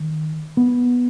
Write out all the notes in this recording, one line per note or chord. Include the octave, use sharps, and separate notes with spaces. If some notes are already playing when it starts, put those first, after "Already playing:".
Already playing: D#3
B3